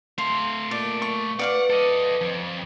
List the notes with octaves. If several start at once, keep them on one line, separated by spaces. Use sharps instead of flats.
A3 F5 C6
A#2 D5
C#6
B4 D5 F5 F#5 D6
A4 D#5
F2